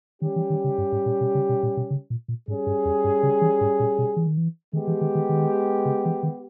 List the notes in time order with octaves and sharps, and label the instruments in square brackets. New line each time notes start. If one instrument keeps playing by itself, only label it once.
[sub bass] D#3 [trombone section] G3 C#4 G4
[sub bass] E3
D#3
C#3
G2
G#2
A#2
B2
C#3
B2
A#2
B2
C#3
A#2
A#2
[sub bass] G#2 [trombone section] G3 C#4 G#4
[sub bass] G2
E2
G2
C#3
E3
G#2
A#2
B2
E3
D#3
E3
[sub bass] D#3 [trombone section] G#3 B3 G4
[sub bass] E3
D#3
D#3
D#3
C#3
E3
D#3